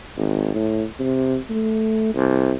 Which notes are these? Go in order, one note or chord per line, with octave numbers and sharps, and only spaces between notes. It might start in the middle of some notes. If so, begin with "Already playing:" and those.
G#1
A2
C3
A3
C2